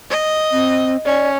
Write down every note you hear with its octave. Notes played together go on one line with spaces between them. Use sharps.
D#5
C4
C#4 D5